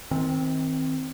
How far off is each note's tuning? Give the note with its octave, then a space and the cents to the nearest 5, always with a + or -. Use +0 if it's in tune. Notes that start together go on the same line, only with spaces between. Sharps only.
D#3 +35 C4 +0